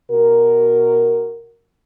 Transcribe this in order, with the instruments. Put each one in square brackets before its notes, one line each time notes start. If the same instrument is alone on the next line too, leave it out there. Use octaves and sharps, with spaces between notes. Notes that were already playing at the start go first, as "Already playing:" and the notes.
[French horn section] B2 F#4 A#4